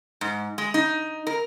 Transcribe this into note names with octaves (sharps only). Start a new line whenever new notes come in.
G#2
G#3
D#4
A#4